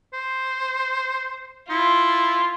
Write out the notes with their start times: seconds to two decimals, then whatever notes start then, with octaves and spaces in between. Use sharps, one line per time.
0.13 C5
1.70 E4 F4